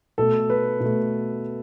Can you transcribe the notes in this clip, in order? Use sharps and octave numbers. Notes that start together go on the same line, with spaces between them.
B2 A3 A4
B4
B2 A3